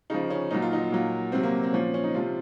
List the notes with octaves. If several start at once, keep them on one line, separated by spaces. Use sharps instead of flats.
C#3 F3 D#4
C#4
A#2 F#3 D#4
F4
D#4
A#2 F#3
C3 F#3 C4
A#3
C4
A#2 F3 C#4
C#4
D#4
C3 F3 F4